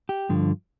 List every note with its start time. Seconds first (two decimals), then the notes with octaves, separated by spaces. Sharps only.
0.09 G4
0.29 G2 D3 F3